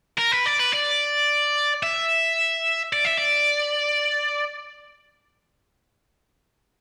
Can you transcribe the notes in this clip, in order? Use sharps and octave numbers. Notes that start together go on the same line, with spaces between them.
A#4
B4
D5
B4
D5
E5
D5
E5
D5